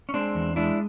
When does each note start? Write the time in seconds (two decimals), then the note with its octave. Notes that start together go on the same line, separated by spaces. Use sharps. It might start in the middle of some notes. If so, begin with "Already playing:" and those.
0.09 C#4
0.14 G#3 C4 D4
0.35 E2
0.56 G#3 D4 E4